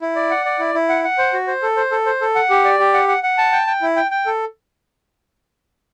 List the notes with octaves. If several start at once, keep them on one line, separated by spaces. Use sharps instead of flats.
E4
D5
F#5
D5
E4
E4
F#5
F#5
C5
F#4
C5
A4
C5
A4
C5
A4
F#5
G4
D5
G4
F#5
F#5
F#5
A5
G5
G5
E4
G5
G5
A4